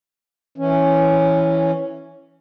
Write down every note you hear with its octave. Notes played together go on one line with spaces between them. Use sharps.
E3 C#4